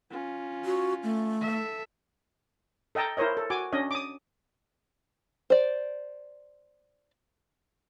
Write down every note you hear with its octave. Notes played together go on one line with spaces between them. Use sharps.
C#4 F4
F#4
A3
A4 E5
A4 D#5 G5 A5 A#5
E4 A#4 C5 C#5 D#5
A4
F#4 G#5 D6
C#4 D4 D#5
D6 D#6
C5 D5